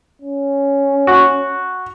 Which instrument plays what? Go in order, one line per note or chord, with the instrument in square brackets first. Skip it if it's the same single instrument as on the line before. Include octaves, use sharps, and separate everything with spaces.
[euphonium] C#4
[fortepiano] F#4